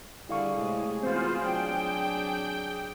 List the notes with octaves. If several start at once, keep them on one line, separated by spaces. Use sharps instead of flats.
D3 G3 E4 G#4 F5 C#6
A2 C3 G#3
E3 B3 C4 F4 F#4 C5
F#3 D4 G5